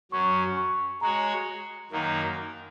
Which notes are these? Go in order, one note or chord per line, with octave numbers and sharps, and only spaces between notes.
F#2 F#3 C#4 C#6
C#6
G#3 F#4 C#5 A#5
F#2 D#3 A#3 D#4